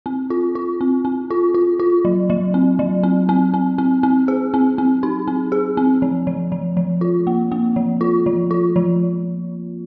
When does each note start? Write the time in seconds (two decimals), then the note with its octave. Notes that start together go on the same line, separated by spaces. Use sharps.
0.06 C4
0.30 F4
0.55 F4
0.81 C4
1.05 C4
1.30 F4
1.54 F4
1.80 F4
2.05 F#3
2.30 F#3
2.54 C4
2.79 F#3
3.03 C4
3.29 C4
3.54 C4
3.78 C4
4.03 C4
4.28 G#4
4.54 C4
4.78 C4
5.03 D#4
5.27 C4
5.52 G#4
5.77 C4
6.02 F3
6.27 F3
6.52 F3
6.77 F3
7.01 F4
7.27 A#3
7.52 A#3
7.76 F3
8.01 F4
8.26 F3
8.51 F4
8.76 F3